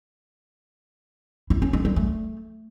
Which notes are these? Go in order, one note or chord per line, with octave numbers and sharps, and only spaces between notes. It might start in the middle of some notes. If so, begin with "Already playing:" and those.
E4
C#4
G#3
G3
A3